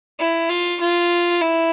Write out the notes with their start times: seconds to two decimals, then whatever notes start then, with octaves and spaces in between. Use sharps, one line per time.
0.19 E4
0.49 F4
0.80 F4
1.41 E4